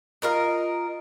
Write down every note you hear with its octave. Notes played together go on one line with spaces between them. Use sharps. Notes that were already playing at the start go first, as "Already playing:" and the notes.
F4 A#4 D#5